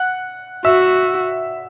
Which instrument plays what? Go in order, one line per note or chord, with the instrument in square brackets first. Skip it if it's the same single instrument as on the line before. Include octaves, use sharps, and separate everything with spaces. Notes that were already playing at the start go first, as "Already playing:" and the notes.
Already playing: [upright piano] F#5 F#6
[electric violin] F#4 [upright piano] E5 E6